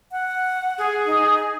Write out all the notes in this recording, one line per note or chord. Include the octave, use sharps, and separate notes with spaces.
F#5
G#4
D#4